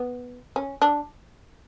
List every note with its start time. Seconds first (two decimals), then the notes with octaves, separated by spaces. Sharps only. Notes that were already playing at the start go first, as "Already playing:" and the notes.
Already playing: B3
0.56 C#4
0.82 D4